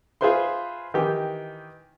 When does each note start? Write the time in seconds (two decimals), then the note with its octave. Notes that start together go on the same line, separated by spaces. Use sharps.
0.21 F4 G#4 B4 C5 E5 C6
0.94 D#3 E3 G4